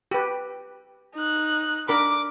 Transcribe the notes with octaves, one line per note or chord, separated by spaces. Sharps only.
G4 B4
D#4 F#6
D4 A#4 B5 D6